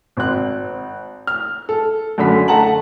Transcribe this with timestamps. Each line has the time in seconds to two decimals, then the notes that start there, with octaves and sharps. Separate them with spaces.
0.17 G#1 C4 F#6
1.27 F6
1.69 A4
2.18 F#2 D3 A3 B5 B6
2.48 A3 F#5 A5 A#5 F#7